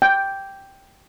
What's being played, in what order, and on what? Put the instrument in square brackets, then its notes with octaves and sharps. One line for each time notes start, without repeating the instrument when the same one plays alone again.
[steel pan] G5